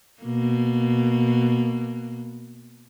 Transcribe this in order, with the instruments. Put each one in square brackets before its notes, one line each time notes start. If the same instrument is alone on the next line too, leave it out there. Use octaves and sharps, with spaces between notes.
[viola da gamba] B2 A#3